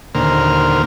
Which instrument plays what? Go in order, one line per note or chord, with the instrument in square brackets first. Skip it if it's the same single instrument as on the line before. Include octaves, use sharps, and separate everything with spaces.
[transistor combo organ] D#2 A#2 D3 A#4 C5 F6